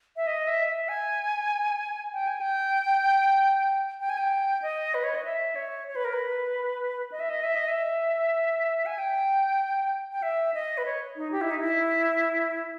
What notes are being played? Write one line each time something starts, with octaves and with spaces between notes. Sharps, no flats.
E5
D#5
E5
E5
G#5
G5
G#5
G5
G5
G#5
G5
D#5
B4
C#5
D#5
E5
C#5
C#5
B4
A#4
B4
D#5
E5
D#5
E5
D#5
E5
G#5
G5
G5
E5
D#5
B4
C#5
D#4
G4
E4
D#4
E4